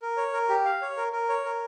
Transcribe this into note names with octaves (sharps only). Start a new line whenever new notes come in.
A#4
C#5
A#4
G4
F5
C#5
A#4
A#4
C#5
A#4